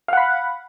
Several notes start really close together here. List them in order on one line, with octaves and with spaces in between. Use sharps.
F5 F#5 B5